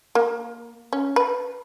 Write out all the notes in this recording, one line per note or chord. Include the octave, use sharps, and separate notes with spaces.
A#3
C#4
B4